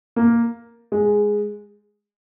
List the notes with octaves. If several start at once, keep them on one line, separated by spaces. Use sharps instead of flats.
A#3
G#3